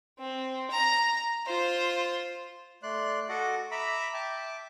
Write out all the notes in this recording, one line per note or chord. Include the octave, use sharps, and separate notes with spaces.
C4
A#5
F4 C5
A3 D5 C6 F#6
F#4 A4 D#5 F#5 D6
E5 A#5 B5 D6 E6
E5 G5 A5 D6